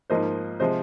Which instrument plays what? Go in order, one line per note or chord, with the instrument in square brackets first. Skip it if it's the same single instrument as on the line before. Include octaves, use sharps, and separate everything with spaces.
[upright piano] G#2 F3 A#3 C5 D#5
C3 F3 G#3 C5 D#5